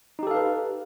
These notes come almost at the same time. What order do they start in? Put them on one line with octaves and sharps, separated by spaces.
D#4 G4 A4 F5 B4